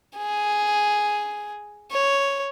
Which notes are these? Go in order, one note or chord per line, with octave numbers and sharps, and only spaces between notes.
G#4
C#5